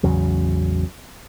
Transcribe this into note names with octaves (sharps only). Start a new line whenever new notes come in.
A1 E2 C#3 F#3